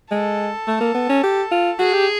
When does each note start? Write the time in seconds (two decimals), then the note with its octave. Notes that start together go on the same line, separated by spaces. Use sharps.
0.11 G#3 A4
0.67 A3
0.81 A#3
0.95 B3
1.09 C#4
1.23 G4
1.51 F4
1.79 F#4 G#4
1.93 G4